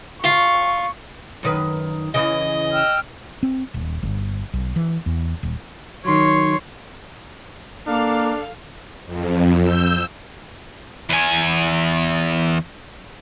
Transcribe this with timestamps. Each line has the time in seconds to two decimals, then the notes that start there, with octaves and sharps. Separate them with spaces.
0.24 F4 C#6
1.43 F#2 D#3 B4
2.14 C#3 E3 D#5
2.72 G5 E6 F6
3.43 C4
3.74 D#1
4.03 G1
4.53 B1
4.76 E3
5.06 E2
5.43 D#1
6.05 D#3 F#3 C#5 C6
7.87 A#3 D4 A4 F5
9.07 F2
9.61 E6 G6
11.09 E2 G#5